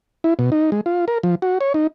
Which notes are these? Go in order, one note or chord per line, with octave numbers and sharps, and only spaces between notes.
E4
B2
D#4
G#3
F4
A#4
F3
F#4
C#5
D#4